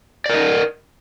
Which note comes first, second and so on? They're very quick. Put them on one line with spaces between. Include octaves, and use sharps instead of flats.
D5 A#4 D#5